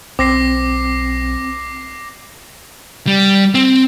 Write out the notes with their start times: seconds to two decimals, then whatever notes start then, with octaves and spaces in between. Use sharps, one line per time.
0.19 B1 C4 D6 A#6 C7
3.07 G3
3.54 C4